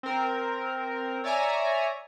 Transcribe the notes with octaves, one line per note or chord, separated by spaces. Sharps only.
C4 A#4
C#5 D5 E5 G#5 A#5